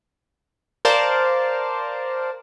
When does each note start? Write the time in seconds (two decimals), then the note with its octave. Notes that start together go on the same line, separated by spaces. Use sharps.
0.85 A#4 C5 D5 F5 A5